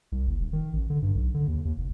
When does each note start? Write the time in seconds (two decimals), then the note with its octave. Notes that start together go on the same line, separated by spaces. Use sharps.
0.12 C2
0.27 F#1
0.40 D#1
0.53 D#3
0.73 A1
0.90 D3
1.02 G2
1.15 B1
1.34 D3
1.48 D#2
1.65 D#2
1.78 F1